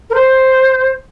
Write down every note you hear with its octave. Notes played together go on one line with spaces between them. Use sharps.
A#4
C5